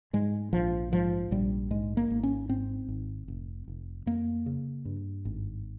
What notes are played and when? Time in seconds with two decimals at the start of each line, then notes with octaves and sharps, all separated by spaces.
0.13 G#2 G#3
0.53 A#1 F3
0.92 G#2 F3
1.31 A#1 G3
1.71 G#2 G#3
1.97 A#3
2.10 G#1
2.23 C#4
2.49 G#2 C4
2.88 G#1
3.28 F1
3.68 F1
4.06 F2 A#3
4.46 C#3
4.85 G2
5.25 G#1